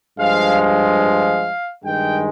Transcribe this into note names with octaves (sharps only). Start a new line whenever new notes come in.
G2 F3 G#3 F5
F5
G2 D#3 G#3 G5